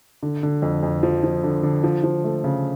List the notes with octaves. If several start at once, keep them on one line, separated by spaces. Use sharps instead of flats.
D3
D3
F2
F2
F3
F3
D3
D3
F3
F3
A3
C#3